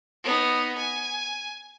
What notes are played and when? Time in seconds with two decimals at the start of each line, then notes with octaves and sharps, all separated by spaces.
0.24 B3 D#4
0.78 G#5